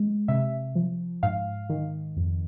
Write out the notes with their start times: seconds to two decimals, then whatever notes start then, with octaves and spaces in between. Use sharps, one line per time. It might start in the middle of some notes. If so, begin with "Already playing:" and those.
Already playing: G#3
0.28 C3 E5
0.75 F3
1.23 G#2 F5
1.69 D#3
2.17 F2